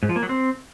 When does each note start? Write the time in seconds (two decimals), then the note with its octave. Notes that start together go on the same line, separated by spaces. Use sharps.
0.03 G#2
0.09 F3
0.16 A#3
0.23 F#3
0.29 C4